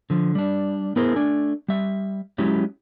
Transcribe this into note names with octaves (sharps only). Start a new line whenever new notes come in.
D3 F3
G3 D4
B3 E4 G#4 A#4 C5
A3 D4 G#5
G3 E5
F#3 G#3 C#4 E4 G4